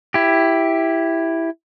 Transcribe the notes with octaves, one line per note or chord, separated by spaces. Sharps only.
E4 G4